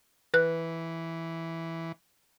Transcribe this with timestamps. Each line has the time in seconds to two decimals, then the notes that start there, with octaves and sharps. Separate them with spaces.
0.34 E3 B4 F#6